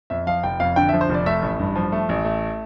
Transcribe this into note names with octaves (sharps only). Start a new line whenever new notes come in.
F2 E5
F3 F5
F1 G5
F2 F5
D3 G5
F3 E5
C5
F1 D5
A3 E5
A1
G2
F3
A3
A1
A3